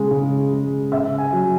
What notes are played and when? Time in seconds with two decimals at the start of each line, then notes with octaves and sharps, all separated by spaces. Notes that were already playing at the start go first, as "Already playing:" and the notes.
Already playing: C#3 G#3
0.11 C#3
0.52 G#3
0.92 C#3 E5
1.18 G#5
1.33 F#3